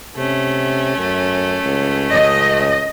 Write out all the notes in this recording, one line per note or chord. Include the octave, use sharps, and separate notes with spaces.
C3 A3 C#4
F#2
C#2
C#2 D#5